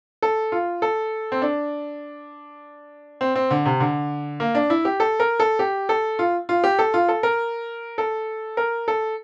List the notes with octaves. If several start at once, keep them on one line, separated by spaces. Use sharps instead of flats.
A4
F4
A4
C4
D4
C4
C4
D3
C3
D3
A#3
D4
E4
G4
A4
A#4
A4
G4
A4
F4
F4
G4
A4
F4
A4
A#4
A4
A#4
A4